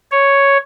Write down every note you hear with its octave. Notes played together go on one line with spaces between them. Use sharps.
C#5